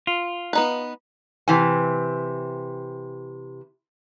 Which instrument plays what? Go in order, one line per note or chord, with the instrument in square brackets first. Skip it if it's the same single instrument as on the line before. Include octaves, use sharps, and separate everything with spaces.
[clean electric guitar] F4
[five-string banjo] B3 D#4 B4
[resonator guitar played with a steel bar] C3 E3 G#5